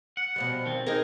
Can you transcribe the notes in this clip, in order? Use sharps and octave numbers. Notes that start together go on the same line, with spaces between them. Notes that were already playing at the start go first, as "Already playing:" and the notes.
F#5
B2 F3 G3
D#3 C4
D#4 G#4 A#4